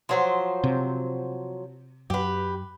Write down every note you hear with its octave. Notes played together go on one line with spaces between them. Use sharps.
F3 F#3 C5
C3
F#2 G4 B4